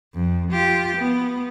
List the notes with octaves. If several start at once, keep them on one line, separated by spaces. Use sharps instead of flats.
F2
F4 G4
B3